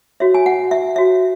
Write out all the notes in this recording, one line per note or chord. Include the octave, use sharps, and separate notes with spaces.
F#4 C#5 E5
G#5
F#5
E5
F#4 C#5 E5